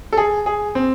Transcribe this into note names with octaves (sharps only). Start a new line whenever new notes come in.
A4
G#4
G#4
C4